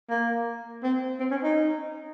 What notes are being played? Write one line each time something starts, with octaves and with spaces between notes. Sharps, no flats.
A#3
C4
C4
C#4
D#4